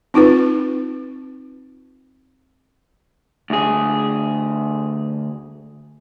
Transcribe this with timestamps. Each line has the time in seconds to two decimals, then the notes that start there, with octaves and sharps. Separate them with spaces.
0.14 C4 D#4 F4 B4
3.50 D2 G#4